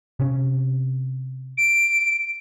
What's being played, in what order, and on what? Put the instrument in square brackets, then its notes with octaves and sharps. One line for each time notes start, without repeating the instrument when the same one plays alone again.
[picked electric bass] C3 C#4
[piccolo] D7